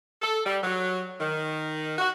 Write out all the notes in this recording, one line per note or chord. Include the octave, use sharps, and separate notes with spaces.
A4
G3
F#3
D#3
F#4